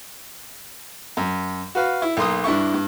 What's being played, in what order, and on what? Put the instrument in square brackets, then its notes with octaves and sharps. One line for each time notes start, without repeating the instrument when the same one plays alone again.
[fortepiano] F#2
F#4 B4 F5
E4
B1 A#3 C6 D#6
G2 D4 E4 C#6
G2